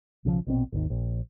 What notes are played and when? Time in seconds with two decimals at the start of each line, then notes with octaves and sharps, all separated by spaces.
0.25 B1 C#3 E3 F3
0.47 A#1 B2 C4
0.72 G#1 D#2 D#3
0.90 A#1